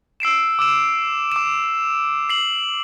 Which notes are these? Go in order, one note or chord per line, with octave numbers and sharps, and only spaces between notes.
E6 C7 D7 E7
D6 E6 E7
D6 E7
C7 F#7